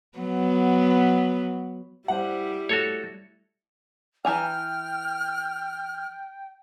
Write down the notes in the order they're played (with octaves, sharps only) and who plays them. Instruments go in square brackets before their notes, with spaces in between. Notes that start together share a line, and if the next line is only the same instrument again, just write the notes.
[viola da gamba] F#3 B3
[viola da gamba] G3 E4 [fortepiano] C5 F#5
[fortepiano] A3 [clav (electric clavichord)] F#4 A4 C#5
[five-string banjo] E3 G#5 A#5 [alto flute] G5 [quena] F6